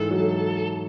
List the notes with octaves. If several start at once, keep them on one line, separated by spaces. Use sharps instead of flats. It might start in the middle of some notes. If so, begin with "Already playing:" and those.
Already playing: G#2 E3 A4
F#3